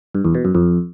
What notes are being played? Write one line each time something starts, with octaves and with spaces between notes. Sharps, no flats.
G2
E2
B2
F#2
F2